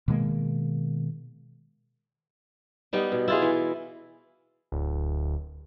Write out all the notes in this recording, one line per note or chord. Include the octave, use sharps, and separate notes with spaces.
B2 D#3 G#3 A#3
G3 B3 D#4
B2
E4 F4 G#4
E3
D1